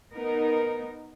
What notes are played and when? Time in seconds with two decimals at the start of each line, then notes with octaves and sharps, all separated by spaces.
0.14 B3 D#4 A#4